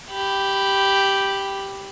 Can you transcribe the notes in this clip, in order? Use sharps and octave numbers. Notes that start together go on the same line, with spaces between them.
G4 B5